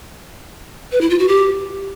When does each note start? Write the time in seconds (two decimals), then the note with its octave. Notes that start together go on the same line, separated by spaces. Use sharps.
0.92 B4
1.01 E4
1.10 F4
1.19 F#4
1.28 G4